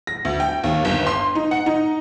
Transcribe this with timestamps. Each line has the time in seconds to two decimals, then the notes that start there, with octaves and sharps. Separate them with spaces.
0.07 A#6
0.25 D2
0.40 G5
0.64 D#2
0.85 G1
1.07 C6
1.35 D#4
1.51 F#5
1.66 D#4